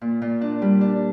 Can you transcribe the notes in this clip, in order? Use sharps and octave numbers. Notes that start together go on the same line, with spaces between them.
A#2
A#2
D4
G3
D4